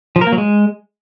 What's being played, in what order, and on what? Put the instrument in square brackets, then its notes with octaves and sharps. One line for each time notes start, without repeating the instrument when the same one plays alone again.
[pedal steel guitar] F3
A#4
A#3
F#3
G#3